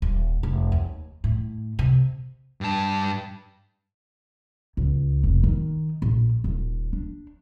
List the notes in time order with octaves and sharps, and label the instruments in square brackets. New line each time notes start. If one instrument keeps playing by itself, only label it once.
[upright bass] D#1
F1
D#2
A2
C3
[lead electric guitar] G2 A5
[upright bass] C#2
F1
D#3
A#1
D#1
D4